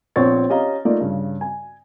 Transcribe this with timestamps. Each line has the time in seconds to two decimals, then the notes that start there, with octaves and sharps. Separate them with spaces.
0.16 A#1 B3 C4 C#5 C#6 A6
0.50 C#4 G4 D#5 F5 A#5
0.85 A3 A#3 D#4 F4 A#4 D5
1.01 G2 C#3
1.41 G#5